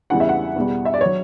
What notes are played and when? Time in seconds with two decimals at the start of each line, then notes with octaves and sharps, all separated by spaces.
0.10 E2 C#3 E3 G3 F#5
0.20 E5
0.29 F#5
0.56 E2 B2 G3
0.85 E5
0.94 D5
1.01 F#3 C#5